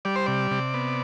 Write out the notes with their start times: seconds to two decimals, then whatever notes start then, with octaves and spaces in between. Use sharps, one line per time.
0.05 G3 D5
0.16 C5
0.26 C3 D5
0.51 C3
0.74 B3